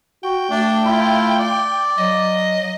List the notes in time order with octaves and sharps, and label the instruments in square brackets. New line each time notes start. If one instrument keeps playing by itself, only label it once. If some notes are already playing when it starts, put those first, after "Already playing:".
[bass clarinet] F#4 [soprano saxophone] G5
[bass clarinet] A3 [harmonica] D4
[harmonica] E4 F4
D5
[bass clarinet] F#3 [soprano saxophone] D#5